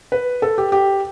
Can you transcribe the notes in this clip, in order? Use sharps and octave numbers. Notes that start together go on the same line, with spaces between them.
B4
A4
G4
G4